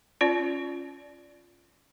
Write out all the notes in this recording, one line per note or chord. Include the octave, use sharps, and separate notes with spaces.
C#4 F4 D5